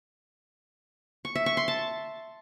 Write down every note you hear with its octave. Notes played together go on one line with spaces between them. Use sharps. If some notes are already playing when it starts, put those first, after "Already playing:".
C#6
E5
C#6
C6
A5